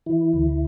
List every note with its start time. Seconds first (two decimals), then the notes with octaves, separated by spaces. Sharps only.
0.06 E3 E4
0.33 D2